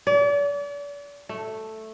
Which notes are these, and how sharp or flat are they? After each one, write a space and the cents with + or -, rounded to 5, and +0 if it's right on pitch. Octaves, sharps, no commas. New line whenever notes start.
D5 -40
A3 +0